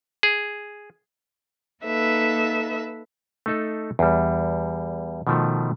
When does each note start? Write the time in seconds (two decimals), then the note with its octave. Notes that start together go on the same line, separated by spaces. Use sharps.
0.23 G#4
1.85 A#3 D#4 A4 B4 E5
3.46 A3 D#4 A4
3.99 E2 G3
5.27 B2 D#3 F3 A3